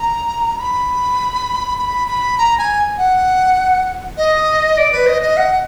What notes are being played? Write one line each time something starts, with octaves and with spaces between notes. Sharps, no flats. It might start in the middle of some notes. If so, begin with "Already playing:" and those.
Already playing: A#5
B5
B5
B5
A#5
G#5
F#5
D#5
D5
B4
D#5
D#5
F#5